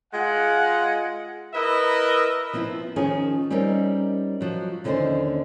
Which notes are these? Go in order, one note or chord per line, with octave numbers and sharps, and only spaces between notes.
G#3 F4 F#5
E4 A#4 B4 D#5 E5
F3 B3 C4 E4
D#3 F3 C#4 G#4
G3 C4 C#4 D#4 A#4
F3 F#3
D#2 D3 C4 C#4 D#4 C5